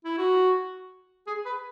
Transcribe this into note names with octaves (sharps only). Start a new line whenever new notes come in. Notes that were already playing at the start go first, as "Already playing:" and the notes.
E4
F#4
G#4
B4